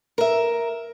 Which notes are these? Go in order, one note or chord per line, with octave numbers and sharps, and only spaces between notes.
A#4 E5